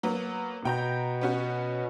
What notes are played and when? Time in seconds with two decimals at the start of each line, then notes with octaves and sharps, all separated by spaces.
0.03 F#3 A#3 B3
0.65 B2 G5 A#5 G6
1.21 B3 C#4 F#4